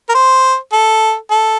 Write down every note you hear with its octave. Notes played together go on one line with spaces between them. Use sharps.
A#4
C5
A4
A4